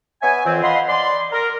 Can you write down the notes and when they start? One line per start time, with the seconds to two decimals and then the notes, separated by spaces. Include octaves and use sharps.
0.22 B3 C#5 E5 G#5
0.46 F2 E3 C4
0.62 D#5 F5 F#5 B5 C6
0.88 D5 C6
1.32 A#4